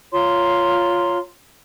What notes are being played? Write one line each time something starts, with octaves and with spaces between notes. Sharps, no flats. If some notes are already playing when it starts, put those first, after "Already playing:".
F4 C#5 A#5 C6